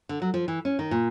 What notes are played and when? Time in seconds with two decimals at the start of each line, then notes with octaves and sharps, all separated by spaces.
0.09 D3
0.22 F#3
0.34 F3
0.48 E3
0.65 C#4
0.79 D#3
0.91 A#2